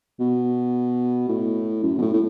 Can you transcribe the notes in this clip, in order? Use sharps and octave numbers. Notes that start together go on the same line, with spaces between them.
B2
A2
F#2
B2
A2
A2